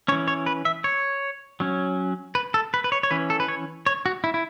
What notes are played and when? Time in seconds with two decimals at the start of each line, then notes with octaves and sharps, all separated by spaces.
0.08 C#4 C#5
0.12 E3
0.28 C#5
0.46 B4
0.65 E5
0.84 C#5
1.60 F#3 C#4
2.35 B4
2.54 A4
2.74 B4
2.84 B4
2.92 C#5
3.03 C#5
3.11 E3 C#4 B4
3.30 A4
3.40 B4
3.48 C#5
3.86 C#5
4.06 F#4
4.24 E4
4.34 E4